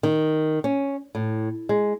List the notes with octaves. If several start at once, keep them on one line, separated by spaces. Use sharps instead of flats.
D#3
C#4
A2
G#3